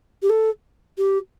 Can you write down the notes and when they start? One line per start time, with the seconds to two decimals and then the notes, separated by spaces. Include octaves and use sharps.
0.22 G4
0.30 A4
0.98 G4